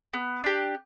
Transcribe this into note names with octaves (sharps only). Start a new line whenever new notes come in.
B3
D4 G4